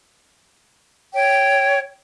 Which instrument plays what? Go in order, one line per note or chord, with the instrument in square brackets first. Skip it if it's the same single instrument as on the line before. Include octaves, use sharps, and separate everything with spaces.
[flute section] C#5 G5